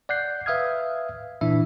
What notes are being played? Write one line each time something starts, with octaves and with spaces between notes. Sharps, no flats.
D5 F#5 F#6 G6 C7
B4 E5 F5 D#6 F6 G#6
A#2 E3 D4 E4 E5